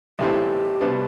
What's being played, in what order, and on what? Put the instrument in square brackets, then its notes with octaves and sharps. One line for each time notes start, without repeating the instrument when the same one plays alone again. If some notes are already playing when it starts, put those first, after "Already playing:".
[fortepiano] B1 A2 E3 A3 C4 [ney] G4
[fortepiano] C2 B2 B3 D4